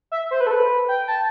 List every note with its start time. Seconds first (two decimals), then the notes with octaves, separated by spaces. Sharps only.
0.12 E5
0.31 C5
0.40 B4
0.47 A4
0.51 B4
0.88 G5
1.08 A5